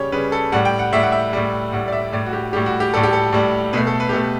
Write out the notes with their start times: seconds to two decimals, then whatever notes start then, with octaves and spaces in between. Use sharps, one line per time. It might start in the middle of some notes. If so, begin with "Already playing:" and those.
Already playing: C#3 G3 G4 C#5
0.12 C#3 G3 B4
0.32 A4
0.52 A2 G3 F#5
0.65 G5
0.79 F#5
0.92 A2 G3 E5
1.03 F#5
1.12 E5
1.33 A2 G3
1.72 A2 G3 F#5
1.88 D5
1.92 E5
2.12 A2 G3 D5
2.26 F#4
2.33 G4
2.53 A2 G3 G4
2.66 F#4
2.80 G4
2.94 A2 G3 A4
3.03 G4
3.13 A4
3.32 A2 G3
3.73 B2 A3 B4
3.87 A4
4.00 B4
4.09 G4
4.13 B2 A3 A4